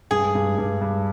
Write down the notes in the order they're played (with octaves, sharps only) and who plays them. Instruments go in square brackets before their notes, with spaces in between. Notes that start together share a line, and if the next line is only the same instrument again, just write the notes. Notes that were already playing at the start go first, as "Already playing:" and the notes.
[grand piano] G2 [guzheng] G#4
[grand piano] G2
G2
G2